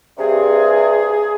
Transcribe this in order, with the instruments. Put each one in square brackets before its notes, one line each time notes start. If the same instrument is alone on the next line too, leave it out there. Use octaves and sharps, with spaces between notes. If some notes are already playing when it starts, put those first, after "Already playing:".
[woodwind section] G2 C3 [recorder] G#4